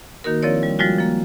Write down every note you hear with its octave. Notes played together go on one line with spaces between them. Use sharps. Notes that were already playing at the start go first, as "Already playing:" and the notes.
D#3 A#3 D#4 F#4 A#4
F3 C4 E4 A#4 C#5 D5
G3
F3 G3 G#3 F4 F#4
F3 A#3